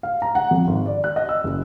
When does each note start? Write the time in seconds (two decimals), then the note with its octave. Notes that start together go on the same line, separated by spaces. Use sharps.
0.03 F5
0.22 A#5
0.35 F#5
0.51 F2
0.67 G#1
0.86 D5
1.04 F#6
1.16 D#5
1.29 E6
1.44 F#1